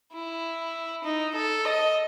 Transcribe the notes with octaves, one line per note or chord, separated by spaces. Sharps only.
E4
D#4
A4
D#5